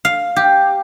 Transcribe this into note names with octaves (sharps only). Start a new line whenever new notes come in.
F5
G4